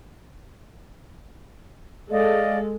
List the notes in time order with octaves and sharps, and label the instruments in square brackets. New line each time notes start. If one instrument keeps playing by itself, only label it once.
[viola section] G#3 A4 [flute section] D5 D#5 F5